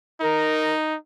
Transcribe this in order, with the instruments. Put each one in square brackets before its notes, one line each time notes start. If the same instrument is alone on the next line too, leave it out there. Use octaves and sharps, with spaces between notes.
[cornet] D#4 [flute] A#4